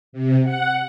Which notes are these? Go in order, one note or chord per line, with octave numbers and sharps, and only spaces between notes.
C3
F#5